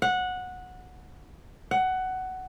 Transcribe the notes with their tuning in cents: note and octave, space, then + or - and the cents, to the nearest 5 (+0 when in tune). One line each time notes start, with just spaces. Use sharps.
F#5 -15
F#5 +15